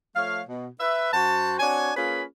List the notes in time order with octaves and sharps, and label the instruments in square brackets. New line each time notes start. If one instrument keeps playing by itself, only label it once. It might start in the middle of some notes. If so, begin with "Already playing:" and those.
[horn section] F3 A3 C#5 F5
B2
B4 E5
F#2 F#4 C5 F#5 A5
C4 D4 F#4 C#5 G#5
A#3 C#4 F4 G#4 B4 B5